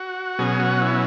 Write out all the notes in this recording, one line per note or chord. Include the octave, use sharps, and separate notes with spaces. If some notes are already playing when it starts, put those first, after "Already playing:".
Already playing: F#4
B2 F#3 C#4 G#4
F#4
E4